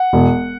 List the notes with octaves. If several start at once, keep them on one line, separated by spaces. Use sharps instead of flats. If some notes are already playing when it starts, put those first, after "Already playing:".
Already playing: F#5
E1